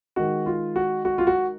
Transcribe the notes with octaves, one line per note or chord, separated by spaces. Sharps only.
D#3 G#3 D#4 F#4
F4
F#4
F#4
F4
F#4